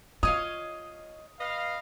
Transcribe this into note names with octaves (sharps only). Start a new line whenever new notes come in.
F4 C#5 D#5 F5 D#6
B4 D#5 F5